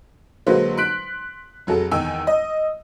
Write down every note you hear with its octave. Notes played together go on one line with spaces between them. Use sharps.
D3 F#3 G#3 A#3 B4 C5
C6 F#6 B6 D7
F1 F#3 G#4 A4
E2 D#3 G5 G#5 E6
D#5